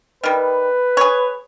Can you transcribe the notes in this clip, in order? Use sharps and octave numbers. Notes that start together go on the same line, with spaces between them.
D#3 G3 B4
G#4 C#5